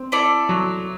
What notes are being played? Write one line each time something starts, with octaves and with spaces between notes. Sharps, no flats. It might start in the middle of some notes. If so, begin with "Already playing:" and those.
Already playing: C4
E4 A4 D5
F#3